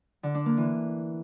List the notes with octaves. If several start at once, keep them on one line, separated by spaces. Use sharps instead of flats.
D3
D4
A#3
E3